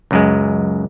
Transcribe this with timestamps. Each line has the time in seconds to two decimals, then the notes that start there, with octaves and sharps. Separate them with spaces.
0.11 C#2 F#2 G#3